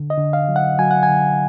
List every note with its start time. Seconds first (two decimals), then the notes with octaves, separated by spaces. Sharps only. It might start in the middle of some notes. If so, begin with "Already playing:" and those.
Already playing: D3
0.10 D#5
0.18 D3
0.33 F5
0.49 F#3
0.56 F#5
0.79 F#3 G#5
0.91 F#5
1.03 G#5
1.09 D3